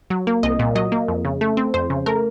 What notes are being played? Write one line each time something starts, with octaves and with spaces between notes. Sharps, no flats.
F#3
A#3
C2 D#5
A#2
F#3 D#5
A#3
F2
C#3
A3
C4
F2 C5
C#3
A3 A#4